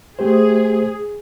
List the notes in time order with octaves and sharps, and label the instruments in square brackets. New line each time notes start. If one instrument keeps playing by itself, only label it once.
[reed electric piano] A3 G4 C5 [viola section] G#4